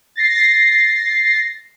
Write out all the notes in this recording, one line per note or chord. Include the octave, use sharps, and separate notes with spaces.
A6 A#6 C7